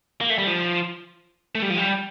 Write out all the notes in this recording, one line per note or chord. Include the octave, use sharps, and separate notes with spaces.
A#3
A3
G3
F3
A3
G3
F3
G3